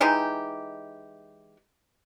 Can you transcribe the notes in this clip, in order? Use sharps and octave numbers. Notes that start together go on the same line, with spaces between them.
E3 G#3 D#4 G4